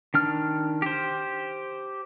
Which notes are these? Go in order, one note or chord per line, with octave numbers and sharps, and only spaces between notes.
D#3 D4 F6
G4 C5